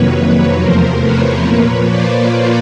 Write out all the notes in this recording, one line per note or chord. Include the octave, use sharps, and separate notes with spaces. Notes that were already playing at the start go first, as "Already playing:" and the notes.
Already playing: F2 C3 D#3 F#3 A#3 B4 C#5
E2 C3 F3 A3 A#4 C5
B4 C#5
A#2 F3 A#3 B4 C#5
C5 D5